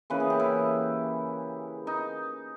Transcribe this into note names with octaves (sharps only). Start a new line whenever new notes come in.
C#3 E3 A#3 C#4 B4
G#4
G4
E4
D#4